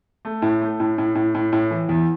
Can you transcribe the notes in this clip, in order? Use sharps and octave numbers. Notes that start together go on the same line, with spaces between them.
A3
A2
A3
A2
A2
A2
A2
A2
E3
E2